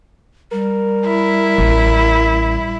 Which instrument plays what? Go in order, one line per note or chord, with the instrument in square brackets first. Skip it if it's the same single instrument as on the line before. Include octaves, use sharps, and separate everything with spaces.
[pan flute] G3 [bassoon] A#4
[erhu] E4
[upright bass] A1